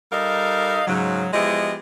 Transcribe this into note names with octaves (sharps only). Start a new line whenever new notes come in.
G3 D#4 A4 A#4 D#5 F5
G#2 C#3 F#3
F3 G#3 B3 E4 G4 D#5